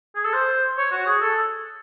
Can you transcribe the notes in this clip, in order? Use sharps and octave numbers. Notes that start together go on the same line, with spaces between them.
G#4
A4
C5
C#5
F#4
G#4
A4